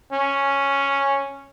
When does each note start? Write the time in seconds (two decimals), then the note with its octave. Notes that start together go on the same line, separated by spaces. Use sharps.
0.12 C#4